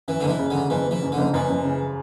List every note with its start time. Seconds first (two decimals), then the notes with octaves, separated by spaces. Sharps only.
0.08 F#2 E3
0.21 F#1 D3
0.29 E3
0.39 C#3
0.50 F#2 D3
0.70 F#1 E3
0.86 F#1 E3
1.02 F#2
1.12 D3
1.18 F#1
1.34 F#2 E3
1.49 F#1
1.64 C#3